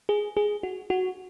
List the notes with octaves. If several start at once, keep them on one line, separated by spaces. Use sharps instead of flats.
G#4
G#4
F#4
F#4